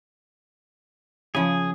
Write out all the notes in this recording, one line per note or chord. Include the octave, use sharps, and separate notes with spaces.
C#3 F3 G#4